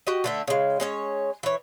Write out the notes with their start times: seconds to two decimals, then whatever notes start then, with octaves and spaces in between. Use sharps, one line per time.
0.07 F#4 G4 D#5
0.24 D3 A3 E5
0.48 C#3 G#3
0.80 G#3 C#4 C#5
1.43 E3 C#5